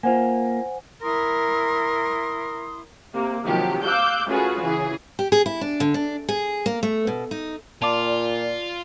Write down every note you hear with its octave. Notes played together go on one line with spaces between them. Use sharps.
A#3 F4 C5 F#5 G#5
E4 A#4 C6 D#6
C3 A#3
C3 D#3 F3 F#3 G4
F5 D6 E6 F#6 G6
A3 C#4 F4 F#4 G#4 B4
C#3 E3 G#4
G4
G#4
E4
D4
D3
D4
G#4
A#3
A3
B2
D#4
A#2 F4 D5 A5 D6